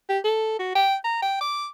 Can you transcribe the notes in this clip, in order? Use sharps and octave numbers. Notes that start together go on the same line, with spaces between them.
G4
A4
F#4
G5
A#5
G5
D6